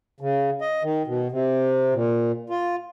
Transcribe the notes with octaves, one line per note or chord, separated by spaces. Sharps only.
C#3
D#5
D#3
B2
C3
A#2
F4